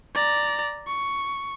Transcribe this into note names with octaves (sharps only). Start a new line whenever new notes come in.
D5 A#5
C#6